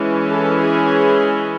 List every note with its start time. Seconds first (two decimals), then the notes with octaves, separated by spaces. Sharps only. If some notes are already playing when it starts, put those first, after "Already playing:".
Already playing: E3 G#3 C#4
0.29 A4
0.59 G#4